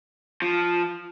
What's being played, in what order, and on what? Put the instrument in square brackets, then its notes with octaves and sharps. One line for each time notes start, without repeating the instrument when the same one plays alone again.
[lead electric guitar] F3